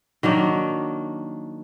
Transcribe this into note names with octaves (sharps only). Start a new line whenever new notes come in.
D#3 F#3 A#3 D4